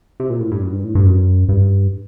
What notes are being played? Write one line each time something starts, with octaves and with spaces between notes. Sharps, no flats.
C3
A#2
A2
G2
F#2
G2
A2
G2
F#2
G2